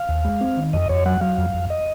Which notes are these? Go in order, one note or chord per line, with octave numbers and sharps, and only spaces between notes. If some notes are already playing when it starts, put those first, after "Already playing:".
Already playing: F5
D#2
G#3
C4
D#3
F2 D#5
F2 C#5
F#3 F#5
F#3 F5
F2
F2
D#5